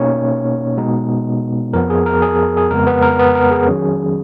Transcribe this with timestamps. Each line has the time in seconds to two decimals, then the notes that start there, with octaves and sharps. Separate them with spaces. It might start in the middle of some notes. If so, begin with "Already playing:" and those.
Already playing: B2 A#3 C#4 D#4 C#5
0.77 B2 G#3 B3 D#4
1.73 F2 F3 B3 A#4
1.90 G#4
2.06 A#4
2.22 G#4
2.57 G#4
2.70 F2 C#3 G#3 B3 A#4
2.87 B3 B4
3.02 A#4
3.19 B3 B4
3.35 A#4
3.51 G#4
3.67 D#3 F#3 C#4